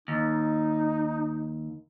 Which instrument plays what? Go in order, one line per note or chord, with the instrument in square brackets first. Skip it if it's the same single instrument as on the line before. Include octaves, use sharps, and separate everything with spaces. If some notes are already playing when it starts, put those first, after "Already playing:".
[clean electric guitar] D#2 [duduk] D#4